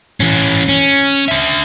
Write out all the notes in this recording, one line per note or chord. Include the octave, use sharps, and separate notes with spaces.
E3 C#4
C#4
D4 E5